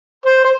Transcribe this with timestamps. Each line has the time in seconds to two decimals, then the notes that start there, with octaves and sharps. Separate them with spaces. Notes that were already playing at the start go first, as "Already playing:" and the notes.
0.26 C5
0.44 C5